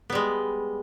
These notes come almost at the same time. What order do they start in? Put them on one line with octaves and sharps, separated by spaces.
B3 G3 G#3